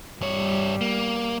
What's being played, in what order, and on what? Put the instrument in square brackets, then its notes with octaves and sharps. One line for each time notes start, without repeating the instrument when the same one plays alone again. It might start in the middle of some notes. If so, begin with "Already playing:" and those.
[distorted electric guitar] G2 C#5 [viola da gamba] G3
[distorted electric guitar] A#3